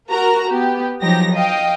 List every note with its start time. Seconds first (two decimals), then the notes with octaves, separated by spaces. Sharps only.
0.10 F#4 A#4 A#5
0.49 B3 G4
1.00 F3 F#3 D#4 G4 A#6
1.35 D#5 F5 G5